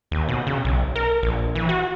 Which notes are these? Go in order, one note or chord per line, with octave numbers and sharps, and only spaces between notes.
D#2
B2
C#3
B1
A#4
A#1
E3
F#4